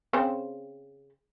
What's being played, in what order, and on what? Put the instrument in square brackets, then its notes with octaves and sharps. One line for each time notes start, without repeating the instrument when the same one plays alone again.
[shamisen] C#3 C4 C5